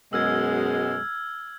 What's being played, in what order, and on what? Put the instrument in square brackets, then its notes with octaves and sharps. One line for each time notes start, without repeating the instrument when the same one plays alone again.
[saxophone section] F#2 B2 G#3 [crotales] E6 F6 G#6